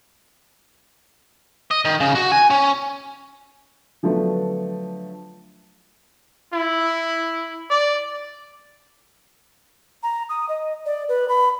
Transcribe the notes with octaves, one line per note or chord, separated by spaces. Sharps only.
D#5
D#3
C#3
F#4
G#5
C#4
D3 F3 F#3 A3 B3 D4
E4
D5
A#5
D#6
D#5
D5
B4
B5